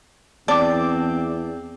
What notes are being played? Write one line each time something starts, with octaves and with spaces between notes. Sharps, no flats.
E2 C4 D5 A5 D6